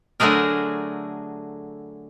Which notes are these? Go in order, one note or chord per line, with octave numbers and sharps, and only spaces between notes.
D3 F#3 A3 G#4 A#4